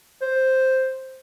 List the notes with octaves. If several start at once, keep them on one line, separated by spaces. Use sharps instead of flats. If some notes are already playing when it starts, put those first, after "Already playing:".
C5